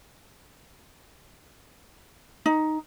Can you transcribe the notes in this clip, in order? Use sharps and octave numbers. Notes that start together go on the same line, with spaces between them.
D#4